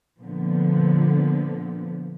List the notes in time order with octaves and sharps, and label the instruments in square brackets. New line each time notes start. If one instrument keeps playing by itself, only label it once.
[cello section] A#2 D3 F3 A3 B3